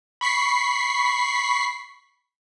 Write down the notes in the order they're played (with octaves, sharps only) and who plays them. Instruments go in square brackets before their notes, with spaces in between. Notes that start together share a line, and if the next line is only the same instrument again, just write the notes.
[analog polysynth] B5 C#6 B6 C7